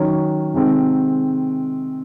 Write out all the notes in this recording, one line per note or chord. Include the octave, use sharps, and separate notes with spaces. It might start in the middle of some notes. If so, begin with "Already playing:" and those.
Already playing: D#3 F#3 C#4
C3 D#3 G#3 C4